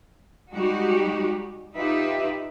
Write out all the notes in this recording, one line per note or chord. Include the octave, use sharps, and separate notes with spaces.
G3 G#3 D#4 F#4 G4
D#4 F4 G4 B4 E5